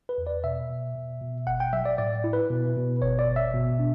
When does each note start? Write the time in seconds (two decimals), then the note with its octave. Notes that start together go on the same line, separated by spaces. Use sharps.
0.09 B4
0.18 E2
0.27 D5
0.44 B2 E5
0.70 B2
0.96 B2
1.22 B2
1.47 G1 F#5
1.60 G5
1.73 F#3 E5
1.85 D5
1.98 A2 D5
2.24 E4
2.33 B4
2.50 B2
2.77 B2
3.02 G1 C#5
3.19 D5
3.28 G1
3.36 E5
3.54 B2
3.79 D4